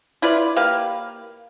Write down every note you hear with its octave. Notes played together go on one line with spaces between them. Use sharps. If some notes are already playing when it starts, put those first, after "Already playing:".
E4 F4 B4 D5
A#3 G4 B4 F5